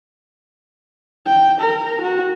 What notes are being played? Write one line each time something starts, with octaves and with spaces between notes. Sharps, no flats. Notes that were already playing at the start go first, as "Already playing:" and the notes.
G5
A#4
F#4